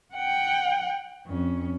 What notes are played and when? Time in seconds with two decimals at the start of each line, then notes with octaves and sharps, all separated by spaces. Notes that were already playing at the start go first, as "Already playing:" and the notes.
0.14 F#5 G5
1.26 F2 C#4